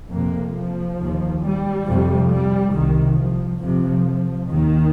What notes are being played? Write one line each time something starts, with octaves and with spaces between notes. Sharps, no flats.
F2 C3 A#3
F3
D#2
G3
F2 C3
G3
C2 C3 D#3
F3
F2 C3 F3
D#2 D#3